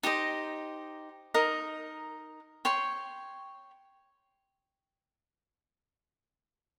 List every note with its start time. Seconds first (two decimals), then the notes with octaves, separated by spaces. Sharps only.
0.03 D#4 G4 C5 D#5
1.34 D#4 A#4 D#5
2.65 C#5 G5 C6